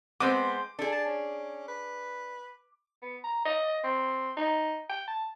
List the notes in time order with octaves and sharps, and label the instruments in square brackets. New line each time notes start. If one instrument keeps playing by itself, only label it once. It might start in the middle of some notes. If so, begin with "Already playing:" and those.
[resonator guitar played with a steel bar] G#3 C4 C5 [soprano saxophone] B3 [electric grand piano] D6
[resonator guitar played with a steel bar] D4 G#4 [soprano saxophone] A4
[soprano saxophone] A5
C#4
B4
B3
A#5
D#5
C4
D#4
G5
A5